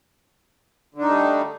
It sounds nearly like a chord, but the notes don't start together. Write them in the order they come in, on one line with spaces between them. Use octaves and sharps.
D3 D4 D#4 A3 G3